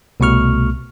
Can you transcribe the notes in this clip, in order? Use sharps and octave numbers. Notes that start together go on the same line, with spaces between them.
C2 B2 A3 C#6 F6